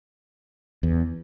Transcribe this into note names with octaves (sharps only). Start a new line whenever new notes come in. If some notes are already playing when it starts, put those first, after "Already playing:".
E2